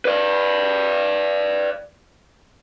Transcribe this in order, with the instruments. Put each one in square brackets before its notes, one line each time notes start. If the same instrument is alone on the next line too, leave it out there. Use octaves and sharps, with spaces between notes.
[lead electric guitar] B4 D5